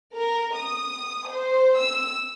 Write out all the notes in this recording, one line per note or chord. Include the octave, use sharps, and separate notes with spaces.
A#4
D#6
C5
E6